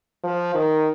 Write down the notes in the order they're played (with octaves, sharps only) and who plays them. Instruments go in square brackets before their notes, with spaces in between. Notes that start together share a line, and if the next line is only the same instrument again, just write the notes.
[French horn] F3
D#3